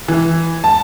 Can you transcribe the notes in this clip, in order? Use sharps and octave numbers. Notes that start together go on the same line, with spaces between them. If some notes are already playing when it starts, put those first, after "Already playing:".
E3
A5